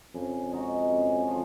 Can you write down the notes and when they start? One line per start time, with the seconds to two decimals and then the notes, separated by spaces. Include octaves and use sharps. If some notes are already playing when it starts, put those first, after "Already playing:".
0.15 F2 C#3
0.52 G#3 D#4 F#4
0.90 C#3
1.28 F3